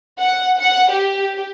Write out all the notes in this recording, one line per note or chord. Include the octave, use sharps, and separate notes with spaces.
F#5
F#5
G4